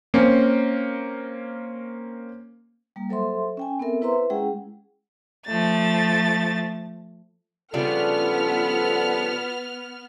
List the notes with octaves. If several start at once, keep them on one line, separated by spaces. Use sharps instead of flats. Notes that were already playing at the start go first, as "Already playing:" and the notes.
A#3 C4 C#4
G3 A#3 A#5
F#3 A4 C5 E5 C6
C#4 G5 G#5
B3 C4 A4 A#4 E5
E4 B4 C5 E5 A#5 C6
G#3 C#4 E4 G#4 F#5 G5
F3 A3 A6
C#3 F3 G3 B3 D4 F4 A4 F6